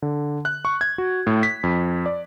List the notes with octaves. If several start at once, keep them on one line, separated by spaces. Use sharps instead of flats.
D3
F#6
C#6
G#6
F#4
A2
B6
F2
D5